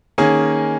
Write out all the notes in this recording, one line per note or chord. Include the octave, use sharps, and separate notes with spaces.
D#3 A#3 C#4 G#4